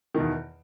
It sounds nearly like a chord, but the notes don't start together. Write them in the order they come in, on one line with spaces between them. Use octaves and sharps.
D#3 B2 E2